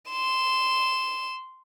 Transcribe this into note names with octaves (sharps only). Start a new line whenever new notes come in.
C6 E7